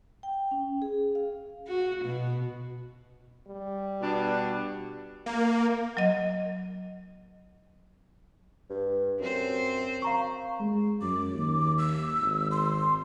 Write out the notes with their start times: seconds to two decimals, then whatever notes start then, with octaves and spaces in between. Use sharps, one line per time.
0.23 G5
0.51 C#4
0.82 G#4
1.15 F5
1.67 F#4
2.04 B2
3.48 G3
4.02 B2 D4
5.26 A#3
5.97 F#3 D#5
8.70 G2
9.20 F#2 C4 C5
10.02 F5 A#5 C#6
10.60 G#3
11.01 F#2 D6
11.34 D#2
11.78 E6
12.20 G#1
12.51 C6